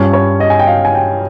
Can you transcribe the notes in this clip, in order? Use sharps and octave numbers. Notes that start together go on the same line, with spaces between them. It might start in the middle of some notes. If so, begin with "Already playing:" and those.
Already playing: G2 G3 C#4 F4 C#5
C#5
D#5
G#5
G5
F5
G#5
G5